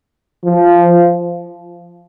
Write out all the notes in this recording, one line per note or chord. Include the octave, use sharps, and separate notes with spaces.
F3